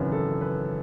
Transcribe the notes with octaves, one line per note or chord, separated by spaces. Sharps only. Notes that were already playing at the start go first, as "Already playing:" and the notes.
Already playing: G#1 F#2 C#3 E3 B4
A4
B4